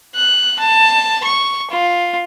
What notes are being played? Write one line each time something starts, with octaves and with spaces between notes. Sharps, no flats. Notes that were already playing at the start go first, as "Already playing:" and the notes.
F#6
A5
C#6
F4